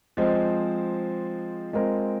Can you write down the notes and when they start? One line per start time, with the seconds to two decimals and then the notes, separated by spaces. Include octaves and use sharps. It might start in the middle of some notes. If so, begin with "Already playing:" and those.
0.17 F3 G#3 C4
1.73 G#3 C4 F4 A#4